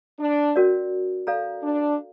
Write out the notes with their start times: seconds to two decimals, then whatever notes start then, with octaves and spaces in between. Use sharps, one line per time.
0.19 D4
0.56 C#4 F#4 A#4 D5
1.27 A4 D5 F5 A#5
1.62 D4